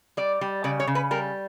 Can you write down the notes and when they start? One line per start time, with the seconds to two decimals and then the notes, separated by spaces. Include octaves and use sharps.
0.17 G3 D5
0.41 G3
0.64 C#3 D5
0.80 C#5
0.87 C#3
0.95 B4
1.11 G3 A#4